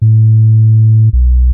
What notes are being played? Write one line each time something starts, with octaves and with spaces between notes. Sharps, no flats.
A2
B1